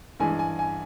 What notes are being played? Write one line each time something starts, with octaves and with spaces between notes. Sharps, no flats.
G2 E3 G#3 G#5
G#5
G#5